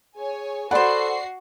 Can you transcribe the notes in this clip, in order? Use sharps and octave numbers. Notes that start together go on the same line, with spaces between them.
G#4 C#5 G#5
F#4 A4 B4 C5 D5 F#5 C7